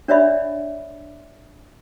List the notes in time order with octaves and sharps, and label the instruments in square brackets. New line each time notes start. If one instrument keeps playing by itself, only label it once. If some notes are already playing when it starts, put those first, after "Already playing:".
[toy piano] D4 C#5 D5 E5 B5